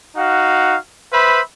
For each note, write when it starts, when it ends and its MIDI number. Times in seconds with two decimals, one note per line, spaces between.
0.16 0.76 63
0.16 0.76 66
0.16 0.76 77
0.16 0.76 78
1.12 1.40 71
1.12 1.40 72
1.12 1.40 76
1.12 1.40 83